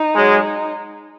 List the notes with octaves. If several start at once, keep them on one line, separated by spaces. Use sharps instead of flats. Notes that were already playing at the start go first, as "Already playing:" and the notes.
Already playing: D#4
F#3 G#3